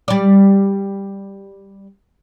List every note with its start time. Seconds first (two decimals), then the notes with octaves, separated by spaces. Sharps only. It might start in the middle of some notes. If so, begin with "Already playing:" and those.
0.08 G3 D5